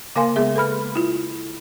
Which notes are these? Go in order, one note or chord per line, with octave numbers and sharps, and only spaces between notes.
C#3 A#3 A#4 F5 G#5 C6
G#3 B3 G#4 E5
A4 B4 B5 F6
E4 F4